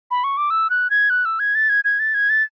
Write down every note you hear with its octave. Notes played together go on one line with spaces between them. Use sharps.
B5
C#6
D6
E6
F#6
G#6
F#6
E6
G#6
A6
G#6
G#6
A6
G#6
A6